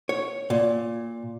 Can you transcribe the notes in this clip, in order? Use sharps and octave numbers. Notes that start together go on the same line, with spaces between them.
C#5
A#2